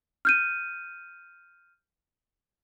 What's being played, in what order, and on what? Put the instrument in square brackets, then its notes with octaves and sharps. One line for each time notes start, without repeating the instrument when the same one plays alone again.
[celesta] F6 G6 D#7